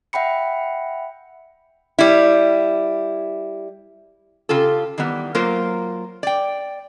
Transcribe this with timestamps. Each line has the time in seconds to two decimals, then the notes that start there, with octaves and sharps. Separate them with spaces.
0.13 E5 F#5 G5 B5 C#7
1.99 G3 E4
4.49 C#3 F4 G4 A4
4.98 D#3 E3 G3 B3
5.35 F#3 A#3 F4 A#4 C5
6.23 D5 G5